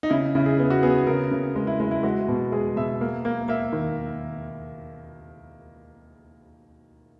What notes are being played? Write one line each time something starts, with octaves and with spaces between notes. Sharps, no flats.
D#4
C#3 E4
C#3 E4
G#4
B3 G#4
F#4
B3 G#4
C#3 A#4
C#3
G#3
E4
G#3 E4
E4
G#3 F#4
B2
G#3 G#4
B2 E5
A#3
A#3
A#3 E5
D#3